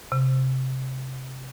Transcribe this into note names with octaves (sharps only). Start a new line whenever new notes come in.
C3